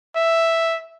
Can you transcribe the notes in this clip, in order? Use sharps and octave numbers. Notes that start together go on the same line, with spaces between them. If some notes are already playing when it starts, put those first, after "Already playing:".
E5